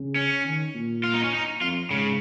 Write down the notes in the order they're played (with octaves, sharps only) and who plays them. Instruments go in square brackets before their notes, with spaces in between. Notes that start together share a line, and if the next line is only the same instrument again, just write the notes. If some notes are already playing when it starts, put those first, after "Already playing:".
Already playing: [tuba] C#3
[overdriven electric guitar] C#4
[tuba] D#3
A#2
[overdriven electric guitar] F4
D#4
C#4
D#4
[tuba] F2 [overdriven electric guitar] F4
[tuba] G#2 [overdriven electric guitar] C#3